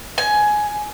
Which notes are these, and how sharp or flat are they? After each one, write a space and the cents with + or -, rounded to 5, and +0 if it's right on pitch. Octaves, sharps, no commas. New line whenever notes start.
G#5 +15